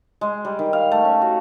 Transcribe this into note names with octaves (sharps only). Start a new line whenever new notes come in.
G#3
G3
D#3
F5
A3
C#4
F#4